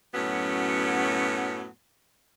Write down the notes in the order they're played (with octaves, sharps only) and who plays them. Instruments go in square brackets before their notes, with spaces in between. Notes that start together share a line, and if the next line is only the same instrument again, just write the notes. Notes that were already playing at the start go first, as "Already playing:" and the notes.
[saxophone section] F#2 A2 F#3 B3 C#4